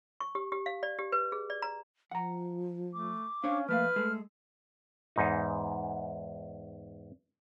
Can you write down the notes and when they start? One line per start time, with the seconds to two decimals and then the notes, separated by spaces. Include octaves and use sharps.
0.20 C#6
0.35 G4
0.52 G4
0.66 F5
0.83 D5
0.98 G4
1.12 B4
1.32 G#4
1.50 D5
1.62 A#5
2.11 F3 F#5 A#5
2.94 A3 D6
3.44 C#4 D4 C5 C#5 F5
3.68 F3 A3 A#3 B4 F5 F6
3.96 G#3 A3 G#4 A4
5.16 E2 G#2 D#4